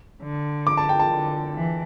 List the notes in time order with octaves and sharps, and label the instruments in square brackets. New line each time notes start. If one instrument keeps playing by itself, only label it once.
[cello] D3
[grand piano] D6
A5
G5
A5
[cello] D3
E3